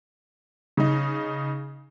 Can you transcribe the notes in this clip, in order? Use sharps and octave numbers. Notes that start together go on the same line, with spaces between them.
C#3 D#4